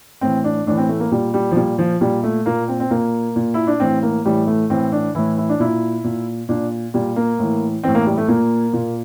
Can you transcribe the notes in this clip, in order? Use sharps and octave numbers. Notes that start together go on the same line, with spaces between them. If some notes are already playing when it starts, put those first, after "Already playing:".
A2 E3 C4
D4
A2 E3 D4
C4
A3
A#3
A#2 G3
G3
F3
A#2 G3
F3
A#2 G3
A3
A#2 A#3
C4
C4
A#2 A#3
A#2
E4
D4
A2 E3 C4
A#3
A2 E3 G3
A3
A2 E3 C4
D4
A2 E3 E4
E4
D4
A#2 E4
A#2
A#2 D4
A#2 G3
A#3
A2 E3
A2 E3 C4
A#3
G3
A3
A#2 A#3
A#2